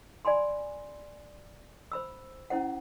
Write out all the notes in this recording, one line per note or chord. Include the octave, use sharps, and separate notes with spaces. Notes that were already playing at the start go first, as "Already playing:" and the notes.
D5 G#5 B5 C6
C5 B5 E6
C#4 E4 C5 F#5